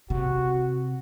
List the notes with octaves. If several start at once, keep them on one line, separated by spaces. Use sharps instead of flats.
C3 F#4